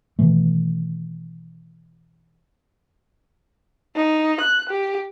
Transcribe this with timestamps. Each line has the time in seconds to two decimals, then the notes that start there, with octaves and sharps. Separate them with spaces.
0.19 B2 D#3 E3 A3
3.96 D#4
4.41 F#6
4.69 G4